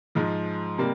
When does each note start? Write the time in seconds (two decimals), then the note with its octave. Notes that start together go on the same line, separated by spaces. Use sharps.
0.15 G#2 F3 G#3
0.78 C3 G3 A#3